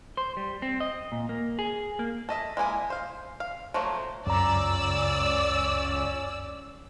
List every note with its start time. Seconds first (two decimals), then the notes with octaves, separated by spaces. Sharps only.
0.17 C5
0.37 G3
0.62 C4
0.80 D#5
1.12 A#2
1.29 A#3
1.59 G#4
1.99 A#3
2.29 A4 D#5 E5
2.57 G#3 A#3 E4 G#5
2.90 C5 F5
3.40 F5
3.74 F3 F#3 A3 A#3
4.27 C#2 F#2 C#4 D5 A#5 E6